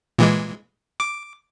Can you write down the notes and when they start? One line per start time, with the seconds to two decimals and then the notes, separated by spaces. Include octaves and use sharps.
0.18 A#2 E3 G#3
1.00 D6